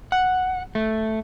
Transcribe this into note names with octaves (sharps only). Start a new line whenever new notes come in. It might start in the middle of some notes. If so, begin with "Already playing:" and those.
F#5
A3